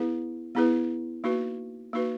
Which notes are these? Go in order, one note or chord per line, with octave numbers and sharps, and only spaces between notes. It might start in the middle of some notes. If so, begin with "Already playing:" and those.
Already playing: B3 E4 G#4 B4
B3 E4 G#4 B4
A#3 D#4 F#4 B4
A#3 D#4 F#4 B4